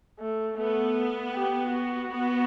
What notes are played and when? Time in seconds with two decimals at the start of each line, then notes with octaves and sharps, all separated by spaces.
0.20 A3
0.57 A3 B3
1.34 G4
1.71 F#4
2.10 B3